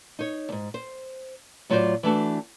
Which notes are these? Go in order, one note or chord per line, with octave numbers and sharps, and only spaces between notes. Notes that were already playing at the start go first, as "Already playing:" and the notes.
D#4 C#5
E2 G#2
C5
A2 F#3 F4 F#4 C5 D5
E3 A3 D4 F#4